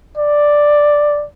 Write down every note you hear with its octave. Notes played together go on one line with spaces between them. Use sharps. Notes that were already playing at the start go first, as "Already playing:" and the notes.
D5